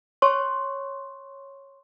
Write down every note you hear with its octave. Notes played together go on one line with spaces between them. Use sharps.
C#5 C6 C#6